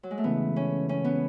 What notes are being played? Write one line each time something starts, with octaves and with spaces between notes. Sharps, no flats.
F#3
G#3
A3
C#3 E3 G#3 B3
C#4
C#4
B3